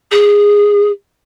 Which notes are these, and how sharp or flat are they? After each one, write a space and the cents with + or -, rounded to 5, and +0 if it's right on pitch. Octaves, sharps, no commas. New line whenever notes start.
G#4 -15